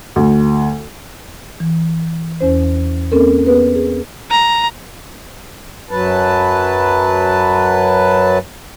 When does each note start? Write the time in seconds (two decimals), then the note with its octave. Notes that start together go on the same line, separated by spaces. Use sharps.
0.16 D2
1.60 E3
2.41 E2 C#4 C5
3.12 A#3 C4 C#4 A4 A#4
3.47 B3 G#4 B4
3.75 G#4
4.31 A#5
5.90 F#2 F#3 B4 A5